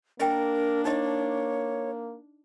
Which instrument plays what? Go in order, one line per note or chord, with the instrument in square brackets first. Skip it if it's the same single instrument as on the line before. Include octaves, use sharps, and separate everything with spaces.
[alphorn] A#3 [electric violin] D4 [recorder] A#4 [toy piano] D#5 G5
[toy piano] D#4 D#5 [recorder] C#5